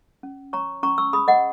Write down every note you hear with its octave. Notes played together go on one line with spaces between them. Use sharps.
C#4
C#5 A#5 C#6
C#4 A#5 C#6
C#6 E6
G#4 B5 D#6
D#5 F#5